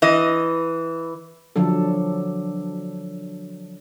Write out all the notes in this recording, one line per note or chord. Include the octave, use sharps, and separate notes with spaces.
E3 D#5
D3 F3 F#3 D4 A4